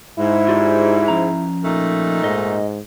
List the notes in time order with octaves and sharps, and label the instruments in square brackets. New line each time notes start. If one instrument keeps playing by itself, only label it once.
[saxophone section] G#2 [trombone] E4
[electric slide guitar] F4 G4 D5
F3 C#4 A#5
[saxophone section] A#2 A3 D#4
[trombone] G#2 [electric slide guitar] D#5